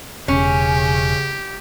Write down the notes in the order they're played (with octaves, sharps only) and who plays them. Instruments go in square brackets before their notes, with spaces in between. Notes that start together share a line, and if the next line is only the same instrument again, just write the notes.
[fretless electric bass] E1 [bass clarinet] C#3 [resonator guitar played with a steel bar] C#4 [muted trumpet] G4